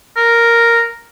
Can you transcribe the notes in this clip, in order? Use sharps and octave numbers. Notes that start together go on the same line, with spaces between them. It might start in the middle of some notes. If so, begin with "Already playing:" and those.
A#4